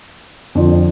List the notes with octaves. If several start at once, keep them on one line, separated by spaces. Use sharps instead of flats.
F2 D3 F3